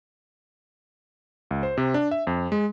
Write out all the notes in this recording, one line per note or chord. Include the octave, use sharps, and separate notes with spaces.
C#2
C5
C3
D4
E5
F2
G#3